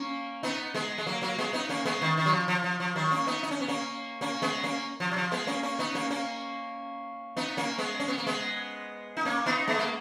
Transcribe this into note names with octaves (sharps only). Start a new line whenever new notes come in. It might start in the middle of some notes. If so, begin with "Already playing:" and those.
Already playing: A#3 C#4
B3 D#4
G#3 B3
G#3
F#3 A#3
F#3 A#3
G#3 B3
B3 D#4
A#3 C#4
G#3 B3
D#3
D#3
F#3
F3
F3
F3
F3
D#3 F#3
A#3 C#4
B3 D#4
D#4
C#4
B3
A#3 C#4
A#3 C#4
G#3 B3
A#3 C#4
F3
F#3
F3
G#3 B3
A#3 C#4
A#3 C#4
B3 D#4
A#3 C#4
A#3 C#4
B3 D#4
A#3 C#4
G#3 B3
C#4
B3
A#3
G#3 B3
D#4
A#3 C#4
B3 D#4
G#3 B3
A#3